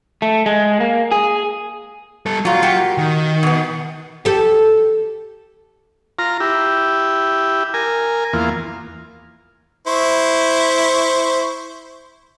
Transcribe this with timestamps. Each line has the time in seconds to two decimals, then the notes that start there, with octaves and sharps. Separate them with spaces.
0.22 A3
0.46 G#3
0.80 A#3
1.12 G#4
2.26 G3 A4
2.45 A#2 F#3 F4
2.62 A#3 F#4 G4
2.98 D#3
3.43 B2 B3
4.25 G4 A4
6.19 F4 A#5
6.40 E4 G4
7.74 A#4 G#5
8.33 E2 A#3 F4
9.87 E4 C5 C#6